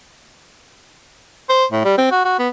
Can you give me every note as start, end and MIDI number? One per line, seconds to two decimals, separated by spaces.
1.49 1.65 72
1.72 1.84 45
1.85 1.97 55
1.98 2.07 60
2.11 2.21 66
2.25 2.35 66
2.39 2.48 59